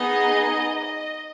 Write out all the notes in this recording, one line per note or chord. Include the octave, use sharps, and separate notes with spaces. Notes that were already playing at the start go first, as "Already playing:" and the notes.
Already playing: B3 D#4 G#4 D#5
D#5